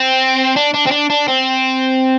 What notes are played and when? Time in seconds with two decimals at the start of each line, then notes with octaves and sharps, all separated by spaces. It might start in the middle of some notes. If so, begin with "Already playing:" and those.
Already playing: C4
0.56 D4
0.74 D4
0.86 C4
0.91 D4
1.10 D4
1.28 C4